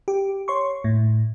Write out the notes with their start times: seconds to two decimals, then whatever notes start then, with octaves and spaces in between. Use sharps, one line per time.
0.08 G4
0.48 C#5 C6 C#6
0.84 A2